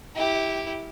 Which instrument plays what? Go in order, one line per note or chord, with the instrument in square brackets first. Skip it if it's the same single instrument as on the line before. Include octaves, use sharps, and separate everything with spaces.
[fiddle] E4 G4